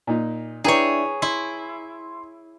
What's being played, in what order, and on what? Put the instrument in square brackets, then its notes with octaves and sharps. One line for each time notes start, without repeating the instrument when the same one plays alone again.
[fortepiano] A#2 D#4
[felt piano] D4 E4 G5 [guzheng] G#4 C#5 [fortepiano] B4 A#5
[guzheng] E4 [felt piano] C6